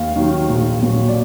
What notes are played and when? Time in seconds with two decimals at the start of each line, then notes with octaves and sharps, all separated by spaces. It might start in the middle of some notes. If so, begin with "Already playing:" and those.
Already playing: D#2 F5
0.16 D#3 F#3 A#3
0.49 A#1
0.82 A#2 F#3
1.08 D5